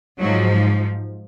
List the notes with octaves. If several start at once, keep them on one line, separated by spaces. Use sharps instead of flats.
G#2 F3 F#3